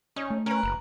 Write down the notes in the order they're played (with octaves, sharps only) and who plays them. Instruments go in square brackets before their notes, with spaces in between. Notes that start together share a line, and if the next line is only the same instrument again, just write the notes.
[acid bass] C#4 [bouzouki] D#4
[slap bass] A3
[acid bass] C#4 [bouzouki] A#4 B4
[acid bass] F#1